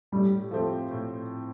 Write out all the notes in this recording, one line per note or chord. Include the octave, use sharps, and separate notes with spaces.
A2 G3
F3 A3 C4 G4
A2